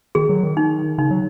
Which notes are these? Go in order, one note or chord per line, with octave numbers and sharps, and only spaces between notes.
D#3 G#4
F#3
D#3
D#4
C#3 D#4
F#3